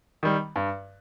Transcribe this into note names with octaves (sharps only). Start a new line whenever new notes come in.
D#3 G3
G2